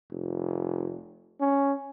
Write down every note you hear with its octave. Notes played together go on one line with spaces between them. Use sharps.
F1
C#4